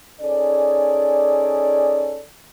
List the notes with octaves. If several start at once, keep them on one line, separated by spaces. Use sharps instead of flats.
C#4 D#4 G#4 A4 D5